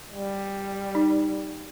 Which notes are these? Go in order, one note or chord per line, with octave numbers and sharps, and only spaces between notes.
G3
D#4